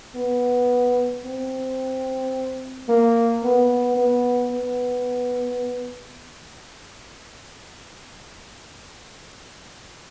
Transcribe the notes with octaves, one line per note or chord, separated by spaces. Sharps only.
B3
C4
A#3
B3
B3
B3